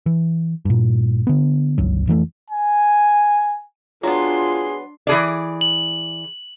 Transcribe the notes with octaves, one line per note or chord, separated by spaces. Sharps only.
E3
G2 A#2
D3 B3
G1 C#2 F#3
F2 E3 G3 A3
G#5
F#3 B3 D4 F4 G#4 C6
E3 G#4 D5
F#7